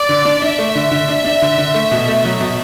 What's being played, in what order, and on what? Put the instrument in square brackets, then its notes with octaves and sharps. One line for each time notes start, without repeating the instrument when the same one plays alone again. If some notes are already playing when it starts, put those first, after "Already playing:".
Already playing: [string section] D5
[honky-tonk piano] D3
D4
[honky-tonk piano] D4 [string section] E5
[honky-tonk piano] A3
D3
D3
D4
D4
D3
D3
A3
B2
A3
F#3
B2